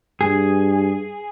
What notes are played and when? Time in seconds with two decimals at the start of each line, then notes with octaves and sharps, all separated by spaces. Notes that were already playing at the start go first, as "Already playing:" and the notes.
0.21 G2 G#4